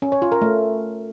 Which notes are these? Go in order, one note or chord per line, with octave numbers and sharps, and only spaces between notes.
C#4
C#5
F4
A#4
A3